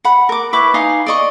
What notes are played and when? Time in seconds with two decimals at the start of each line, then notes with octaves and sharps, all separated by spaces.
0.05 F#5 B5
0.29 A#4 D6
0.53 E4 B4 C#6 D6
0.74 D#4 F5 G#5 D#6
1.07 D5 D#5 C#6